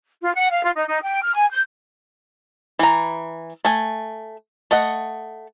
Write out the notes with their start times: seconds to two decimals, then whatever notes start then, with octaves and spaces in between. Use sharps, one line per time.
0.22 F4
0.34 F#5
0.50 F5
0.64 F4
0.76 D#4
0.88 D#4
1.03 G5
1.22 F6
1.34 G#5
1.51 G6
2.79 E3 A#5
3.65 A3 G#5
4.71 A3 D#5 F#5